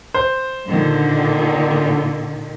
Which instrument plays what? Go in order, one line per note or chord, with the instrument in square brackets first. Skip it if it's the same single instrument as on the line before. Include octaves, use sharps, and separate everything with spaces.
[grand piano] C5
[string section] A#2 D3 D#3